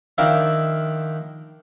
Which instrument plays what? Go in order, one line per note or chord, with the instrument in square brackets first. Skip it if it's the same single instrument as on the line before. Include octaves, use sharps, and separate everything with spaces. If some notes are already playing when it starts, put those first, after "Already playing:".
[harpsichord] D#3 F3 D4 E4 F4